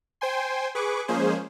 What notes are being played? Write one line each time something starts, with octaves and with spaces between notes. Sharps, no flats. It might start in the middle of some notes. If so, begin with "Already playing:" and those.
C5 G5 G#5 C6
G#4 B4 C#6 D6
F3 G#3 A#3 C#4 G#4 C5